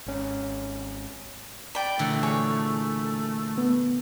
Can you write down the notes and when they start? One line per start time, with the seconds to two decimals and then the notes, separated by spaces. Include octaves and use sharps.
0.06 G#1 C#4
1.75 D5 G5 B5
1.99 A#2 D3 E3 A3
2.23 G#4 C#5
3.58 B3